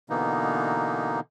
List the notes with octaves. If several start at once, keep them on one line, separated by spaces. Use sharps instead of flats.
B2 D3 E3 A#3 B3 D#4